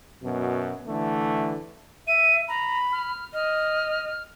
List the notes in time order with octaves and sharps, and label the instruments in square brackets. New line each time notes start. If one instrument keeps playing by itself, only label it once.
[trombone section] F#2 B2
D3 E3 A3
[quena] E5 [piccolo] D#7
[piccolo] A#5 [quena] B5
[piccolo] F6
[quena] D#5 [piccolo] F6